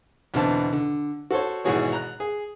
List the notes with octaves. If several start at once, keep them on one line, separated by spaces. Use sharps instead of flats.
E2 B2 D3 C4 A5
D3
F#4 A4 C5 C#5
G#1 B2 E3 F#4 G#4 C#5
A#5 F#6
G#4